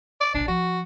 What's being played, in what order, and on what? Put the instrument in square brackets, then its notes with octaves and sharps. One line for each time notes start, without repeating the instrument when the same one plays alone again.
[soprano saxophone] D5
[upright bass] A#1 A#2 [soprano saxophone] D4
[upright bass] F3 [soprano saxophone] F#4